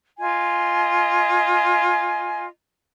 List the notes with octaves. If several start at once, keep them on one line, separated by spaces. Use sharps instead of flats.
F4 D#5 G#5